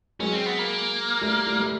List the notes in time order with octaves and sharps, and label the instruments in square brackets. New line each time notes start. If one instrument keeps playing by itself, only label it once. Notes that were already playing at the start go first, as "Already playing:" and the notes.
[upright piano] F#3 G#3 [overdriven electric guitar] C#4
[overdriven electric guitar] C4
B3
A#3
[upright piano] G3 A3
G3 A3
G3 A3